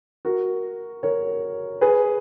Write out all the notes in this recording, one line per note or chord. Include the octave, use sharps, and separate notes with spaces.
F#4 A#4
A#4 C#5
G#4 B4